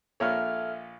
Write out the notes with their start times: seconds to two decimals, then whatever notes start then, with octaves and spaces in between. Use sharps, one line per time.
0.20 A#1 A#2 A4 C#5 E5 F6